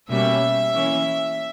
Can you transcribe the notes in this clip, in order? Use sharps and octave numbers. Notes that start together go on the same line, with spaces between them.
B2 G3 A#3 C#4 E5
E3 A#3 C#4